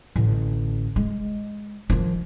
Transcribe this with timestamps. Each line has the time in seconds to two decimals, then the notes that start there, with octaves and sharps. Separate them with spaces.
0.16 A1 D3
0.96 G#3
1.90 D#3 F3